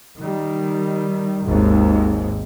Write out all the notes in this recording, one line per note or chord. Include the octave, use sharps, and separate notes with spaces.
D#3 G3
G#1 D#2 G#2